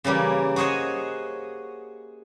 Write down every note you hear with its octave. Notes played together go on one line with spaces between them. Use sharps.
C#3 E3 G3 A#3
F#4 G#4 C5 C#5 D#5